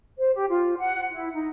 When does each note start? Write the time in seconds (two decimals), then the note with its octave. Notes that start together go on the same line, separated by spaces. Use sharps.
0.17 C5
0.34 G4
0.50 F4
0.79 F#5
1.10 E4
1.32 D#4